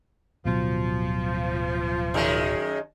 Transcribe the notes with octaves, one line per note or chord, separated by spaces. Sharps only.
D1 B2 F3 F#3
F#2 D#3 G#3